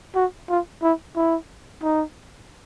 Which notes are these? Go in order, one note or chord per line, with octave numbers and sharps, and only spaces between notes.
F#4
F4
E4
E4
D#4